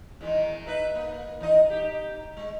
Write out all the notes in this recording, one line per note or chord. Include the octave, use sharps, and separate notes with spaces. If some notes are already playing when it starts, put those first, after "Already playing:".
E2 D#3 G#3
D#4 B4 E5
A#3
E3 D#4 D#5
D#4 G4
G#3